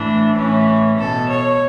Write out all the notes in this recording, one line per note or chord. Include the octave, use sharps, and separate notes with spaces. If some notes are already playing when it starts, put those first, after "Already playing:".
Already playing: A2 E3 D4
A2 E3 C#4
B2 A4
C#5